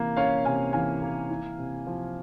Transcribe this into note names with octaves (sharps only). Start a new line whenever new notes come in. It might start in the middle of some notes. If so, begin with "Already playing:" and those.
Already playing: C3 E3 A#3 C#4
C#4 C#5 F5
C3 F5 G#5
E3 F5 G#5
A#3
E4
C3
F3